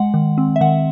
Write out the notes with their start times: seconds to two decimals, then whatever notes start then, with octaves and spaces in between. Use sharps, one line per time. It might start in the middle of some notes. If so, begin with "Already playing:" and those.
Already playing: G#3 F#5
0.14 D#3
0.38 C4
0.56 E5
0.61 D#3 F#5